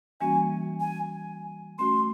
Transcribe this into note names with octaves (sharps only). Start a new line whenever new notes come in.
E3 G3 A#3 C#4 F#4 G#5
G#5
A3 C#4 F#4 C6